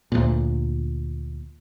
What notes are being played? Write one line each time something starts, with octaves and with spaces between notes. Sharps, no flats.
D2 A#2